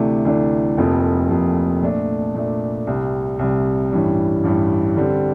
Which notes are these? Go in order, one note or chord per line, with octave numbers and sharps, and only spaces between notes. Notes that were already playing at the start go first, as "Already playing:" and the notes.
Already playing: D2 C3 E3 A3 D4
D2 C3 E3 A3 D4
F1 F2 C3 F3 A#3
F1 F2 C3 F3 A#3
A#2 A3 D4
A#2 A3 D4
C2 C3 G3
C2 C3 G3
A1 G2 E3 G3
A1 G2 E3 G3
D3 G3 C4